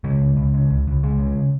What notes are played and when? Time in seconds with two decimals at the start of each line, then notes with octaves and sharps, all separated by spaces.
0.04 C#3 G#3
0.21 C#2
0.37 C#2
0.54 C#3
0.71 C#2
0.87 C#2
1.03 C#2 G#3
1.19 C#3